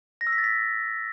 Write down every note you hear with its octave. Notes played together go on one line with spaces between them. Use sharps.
A#6
E6
B6
A6
B6